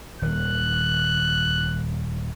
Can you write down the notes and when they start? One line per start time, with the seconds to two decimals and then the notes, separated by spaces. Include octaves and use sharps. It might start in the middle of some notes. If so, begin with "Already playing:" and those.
0.22 D#1 D#3 F#6